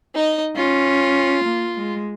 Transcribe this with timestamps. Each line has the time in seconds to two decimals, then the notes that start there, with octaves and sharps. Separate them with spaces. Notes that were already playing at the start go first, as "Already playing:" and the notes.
0.15 D#4 D#5
0.56 C#4 F4
1.44 A#3
1.78 G#3